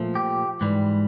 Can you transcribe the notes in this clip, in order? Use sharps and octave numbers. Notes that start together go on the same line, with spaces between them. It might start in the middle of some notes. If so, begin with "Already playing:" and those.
Already playing: A#2 F3 A3
G4
G#2 E3 G3